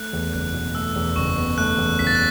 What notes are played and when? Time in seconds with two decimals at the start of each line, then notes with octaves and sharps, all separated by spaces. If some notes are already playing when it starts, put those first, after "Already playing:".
Already playing: A3 F#6
0.13 E2
0.33 F#1 F#6
0.54 B2
0.75 A3 E6
0.96 E2
1.16 F#1 C#6
1.37 B2
1.58 A3 F#6
1.78 E2
1.99 F#1 B6
2.07 A6
2.15 F#6